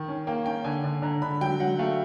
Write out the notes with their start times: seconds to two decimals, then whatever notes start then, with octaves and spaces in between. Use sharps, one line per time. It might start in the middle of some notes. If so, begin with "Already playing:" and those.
Already playing: D#3
0.08 C#4
0.27 A#3 G5
0.46 C#4 G5
0.64 D3 G#5
0.84 D3
1.02 D3 A#5
1.22 D3 B5
1.41 F#3 G5
1.59 F#3 F#5
1.79 A3 F5